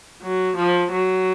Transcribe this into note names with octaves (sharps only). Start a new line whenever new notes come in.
F#3
F3
F#3